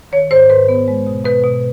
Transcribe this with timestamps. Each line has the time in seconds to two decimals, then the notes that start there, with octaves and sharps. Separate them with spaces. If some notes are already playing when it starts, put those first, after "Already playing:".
0.12 D#3 C#5
0.31 G#2 C5
0.50 G#2 B4
0.68 B3
0.88 G#3
1.07 B2
1.25 B2 B4
1.44 B2